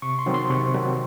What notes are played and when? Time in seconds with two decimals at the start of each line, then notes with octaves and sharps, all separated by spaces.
0.02 C3 C#6
0.19 C6
0.26 D#3 F#3 C4 D#4
0.34 C6
0.50 C3 C#6
0.74 D#3 F#3 C4 D#4